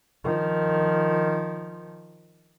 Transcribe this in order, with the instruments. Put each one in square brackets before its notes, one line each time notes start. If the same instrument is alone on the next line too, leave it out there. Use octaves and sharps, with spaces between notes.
[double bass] D#3 F3